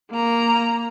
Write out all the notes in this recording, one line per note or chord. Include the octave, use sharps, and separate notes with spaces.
A#3 A#5